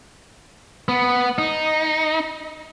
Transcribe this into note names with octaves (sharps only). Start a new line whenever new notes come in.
B3
D#4